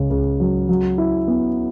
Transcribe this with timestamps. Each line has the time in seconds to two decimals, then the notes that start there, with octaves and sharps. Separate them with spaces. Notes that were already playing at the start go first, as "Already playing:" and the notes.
Already playing: C#2 C#3
0.10 C#2
0.40 F#3
0.69 F#3
0.98 E4
1.28 B3